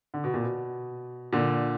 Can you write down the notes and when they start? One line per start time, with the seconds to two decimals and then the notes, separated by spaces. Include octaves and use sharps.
0.14 D3
0.24 B2
0.34 A#2
0.43 B2
1.33 A#2 D3